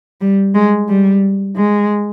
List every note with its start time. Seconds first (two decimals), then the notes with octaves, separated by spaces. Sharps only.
0.21 G3
0.54 G#3
0.88 G3
1.56 G#3